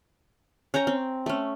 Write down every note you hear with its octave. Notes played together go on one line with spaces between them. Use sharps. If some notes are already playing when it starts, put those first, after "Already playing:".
C#4 C#5 G5 A#5
C4
A3 C#4